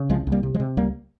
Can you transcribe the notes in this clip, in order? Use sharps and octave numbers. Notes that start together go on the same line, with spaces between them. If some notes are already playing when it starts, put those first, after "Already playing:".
Already playing: C#3
C2 F3 G#3
C2
G3 A#3
C3
F3 G#3
C3
C#2 G3 A#3